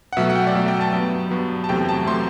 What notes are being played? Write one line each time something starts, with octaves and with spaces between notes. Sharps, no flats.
F#5
B2 F#3 A3 E5
F#5
G5
D5
B2 F#3 A3 E5
G5
A5
G2 F#3 B3
G2 F#3 B3
A5
E2 C3 F#3 A3 G5
A5
C3 F#3 A3 C6